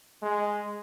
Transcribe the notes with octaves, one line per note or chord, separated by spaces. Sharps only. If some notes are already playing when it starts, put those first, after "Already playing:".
G#3